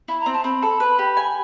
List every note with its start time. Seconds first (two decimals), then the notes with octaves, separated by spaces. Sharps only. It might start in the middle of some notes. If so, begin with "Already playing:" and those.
0.08 E4 B5
0.21 A#5
0.26 C4
0.33 A5
0.44 C4 B5
0.63 A4
0.80 B4
0.99 G4
1.17 G#5